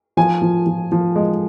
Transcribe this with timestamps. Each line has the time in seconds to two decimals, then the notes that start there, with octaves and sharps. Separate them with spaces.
0.17 F3 G#5
0.42 F3
0.67 F3
0.92 F3
1.16 G#3